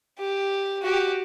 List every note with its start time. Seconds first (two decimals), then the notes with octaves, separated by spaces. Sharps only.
0.19 G4
0.82 F#4 G4